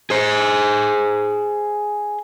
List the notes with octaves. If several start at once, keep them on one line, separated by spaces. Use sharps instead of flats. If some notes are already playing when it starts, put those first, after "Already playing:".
G#4 C5